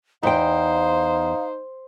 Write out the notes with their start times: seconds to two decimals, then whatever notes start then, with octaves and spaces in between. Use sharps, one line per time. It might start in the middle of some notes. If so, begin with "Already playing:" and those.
0.23 E2 D#4 C5 F5 G5